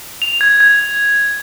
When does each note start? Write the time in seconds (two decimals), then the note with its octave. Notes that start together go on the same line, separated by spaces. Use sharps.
0.22 F7
0.41 G#6
0.60 G#6